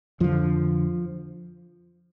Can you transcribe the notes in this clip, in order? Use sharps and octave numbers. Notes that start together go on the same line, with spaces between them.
F2 D3 F3